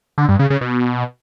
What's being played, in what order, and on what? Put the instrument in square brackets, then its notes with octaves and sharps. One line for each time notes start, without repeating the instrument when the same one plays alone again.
[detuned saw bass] D3
G2
C#3
C#3
B2